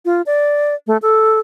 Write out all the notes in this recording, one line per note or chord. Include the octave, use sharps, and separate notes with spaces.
F4
D5
A3
A4